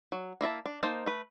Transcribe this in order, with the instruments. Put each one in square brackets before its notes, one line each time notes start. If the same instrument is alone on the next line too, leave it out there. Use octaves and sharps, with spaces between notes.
[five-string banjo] F#3
A#3 E4 E5 A5
D4
A#3 D#4 C5 A5
A3 B4